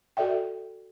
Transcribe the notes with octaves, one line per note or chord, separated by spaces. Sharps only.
F#4 A4 D5 E5 G5